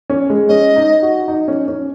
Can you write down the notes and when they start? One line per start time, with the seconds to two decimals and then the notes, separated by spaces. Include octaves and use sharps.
0.10 C#4
0.30 G#3
0.49 C#4 D#5
0.76 D#4
1.02 F#4
1.28 D#4
1.48 C#4
1.68 C#4